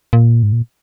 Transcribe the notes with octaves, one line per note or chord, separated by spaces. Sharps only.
A#2
G#2
A#2